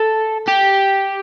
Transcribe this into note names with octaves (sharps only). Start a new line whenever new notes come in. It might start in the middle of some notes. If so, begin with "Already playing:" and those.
Already playing: A4
G4